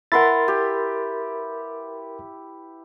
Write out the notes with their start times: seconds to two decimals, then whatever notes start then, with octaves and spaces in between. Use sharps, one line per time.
0.12 E4 A#4 B4 F#5 C6 A6
0.48 G4